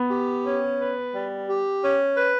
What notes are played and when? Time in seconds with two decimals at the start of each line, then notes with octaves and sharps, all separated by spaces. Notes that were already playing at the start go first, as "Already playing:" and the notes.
Already playing: B3
0.10 G4
0.44 C#4
0.79 B4
1.12 G3
1.48 G4
1.81 C#4
2.16 B4